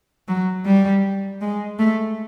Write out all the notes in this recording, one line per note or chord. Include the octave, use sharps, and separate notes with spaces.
F#3
G3
G#3
A3